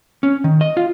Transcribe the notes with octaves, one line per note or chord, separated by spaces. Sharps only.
C#4
D#3
D#5
F4